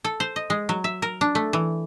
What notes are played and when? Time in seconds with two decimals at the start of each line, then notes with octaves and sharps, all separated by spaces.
0.04 A4
0.20 C5
0.36 D#5
0.50 G#3
0.69 F#3
0.84 E5
1.02 A#4
1.21 D4
1.35 A3
1.53 E3